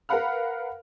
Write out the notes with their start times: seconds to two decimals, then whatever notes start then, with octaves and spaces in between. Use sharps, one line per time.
0.09 A#4 B4 F5 F#5 B5 F6